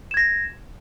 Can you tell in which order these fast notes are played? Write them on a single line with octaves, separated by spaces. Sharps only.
E7 G#6 A#6